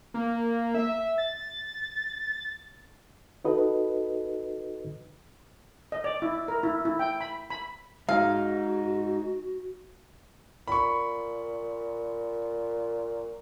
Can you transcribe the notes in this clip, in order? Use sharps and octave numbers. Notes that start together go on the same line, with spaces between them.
A#3
E5
A6
D#4 F#4 A4 B4 D#5
D#5
D5
E4
A#4
E4
E4
G5
B5
B5
G#3 D#4 F#4 F5
A#2 B5 C#6